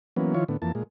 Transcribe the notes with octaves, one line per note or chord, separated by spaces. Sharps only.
E3 F#3 A#3 B3 C#4
D#3 F3 E4 F4 C#5
A2 D3 B3
F2 E3 A#3 A5
A#2 G#3